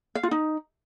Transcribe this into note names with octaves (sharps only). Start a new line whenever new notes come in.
F5
F4
D#4